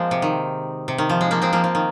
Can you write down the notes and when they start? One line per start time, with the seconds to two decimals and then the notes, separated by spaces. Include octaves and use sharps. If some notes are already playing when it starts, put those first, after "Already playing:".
Already playing: F3 G#3 A#3 C4
0.11 C3
0.22 D#3
0.88 C3
0.98 D#3
1.10 F3
1.21 G#3
1.31 F3 A#3
1.42 G#3 C4
1.53 F3 A#3
1.64 F3
1.75 D#3